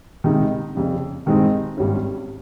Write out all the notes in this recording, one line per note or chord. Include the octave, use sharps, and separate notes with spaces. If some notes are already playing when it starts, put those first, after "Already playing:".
C#2 C3 D#3 G#3 D#4
F1 F2 C#3
G2 D#3 G#3 C4 D#4
G#1 G2 G3 C#4